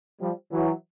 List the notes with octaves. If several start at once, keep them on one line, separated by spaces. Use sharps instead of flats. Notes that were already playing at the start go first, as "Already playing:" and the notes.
F3 G3
E3 F#3